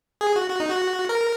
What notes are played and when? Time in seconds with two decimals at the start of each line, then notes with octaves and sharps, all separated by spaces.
0.21 G#4
0.36 F#4
0.50 F#4
0.60 D#4
0.70 F#4
1.09 A#4